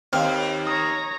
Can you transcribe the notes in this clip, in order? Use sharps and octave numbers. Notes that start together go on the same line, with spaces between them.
D#2 C4 F5 F6
C#5 A#5 D#6